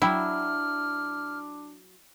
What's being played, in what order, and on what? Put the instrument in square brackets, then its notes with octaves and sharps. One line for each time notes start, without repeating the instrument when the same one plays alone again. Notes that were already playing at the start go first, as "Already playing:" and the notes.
[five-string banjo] F#3 G5 [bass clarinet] D4 [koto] E4 [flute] F6